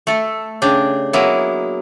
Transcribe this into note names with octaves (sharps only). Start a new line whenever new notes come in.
A3 A4
C#3 D4 G4
F#3 G#3 A#3 B3 E4